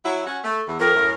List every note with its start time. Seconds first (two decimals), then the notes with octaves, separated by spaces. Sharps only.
0.04 F#3 E4
0.26 C#4 F#4
0.44 A3
0.67 E2 E3
0.79 F2 A#4
0.95 F#2 A2